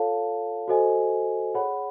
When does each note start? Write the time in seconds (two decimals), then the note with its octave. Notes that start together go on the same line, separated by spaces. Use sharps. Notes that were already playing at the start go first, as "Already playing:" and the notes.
Already playing: F4 A4 C#5 F5 A5
0.68 F#4 A4 C5 D#5 G#5
1.55 G#4 C#5 F#5 B5